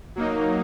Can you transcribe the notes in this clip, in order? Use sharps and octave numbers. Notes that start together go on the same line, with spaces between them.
F#3 A#3 D#4